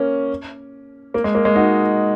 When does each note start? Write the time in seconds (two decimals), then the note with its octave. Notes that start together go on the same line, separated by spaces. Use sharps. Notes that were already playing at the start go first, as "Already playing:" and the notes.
Already playing: A#3 C#4
1.14 A#3
1.24 G#3
1.35 A#3
1.45 G#3
1.56 D#4 F#4